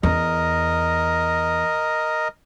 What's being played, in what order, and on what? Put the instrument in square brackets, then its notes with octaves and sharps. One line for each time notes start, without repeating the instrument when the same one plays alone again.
[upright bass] E2 [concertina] A#4 D#5